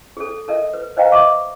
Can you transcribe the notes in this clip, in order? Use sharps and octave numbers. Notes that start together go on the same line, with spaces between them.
G#4 A4
A4 A#4 D#5 E5
B4
B4 C5 D#5 F5 G5 A#5
D#5 E5 C#6 D6